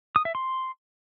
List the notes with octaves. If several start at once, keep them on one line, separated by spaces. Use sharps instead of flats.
D#6
E5
C6